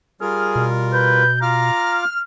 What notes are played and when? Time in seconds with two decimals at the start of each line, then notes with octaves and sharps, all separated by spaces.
0.21 G3 F4 G#4 A#4 F6
0.56 B2
0.93 B4 G6
1.42 F4 F5 A#5 D6 F6